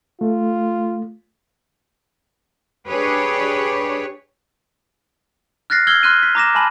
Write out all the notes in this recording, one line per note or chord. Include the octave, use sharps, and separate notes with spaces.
A3 F4
D4 G4 G#4 B4 C#5
F6 F#6 A6 A#6 C7
E6 F6 G#6 F#7 G7
C6 F6 F#6 D#7
B6
A#5 D6 A#6 E7
G#5 A5 B5 F#7